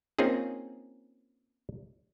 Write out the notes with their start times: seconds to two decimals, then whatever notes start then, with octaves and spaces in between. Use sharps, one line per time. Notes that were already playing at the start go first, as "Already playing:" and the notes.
0.19 A#3 C4 C#4 D#4 F4 G#4